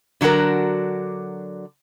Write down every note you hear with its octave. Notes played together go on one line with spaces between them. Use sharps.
D3 F#3 D4 F#4 A#4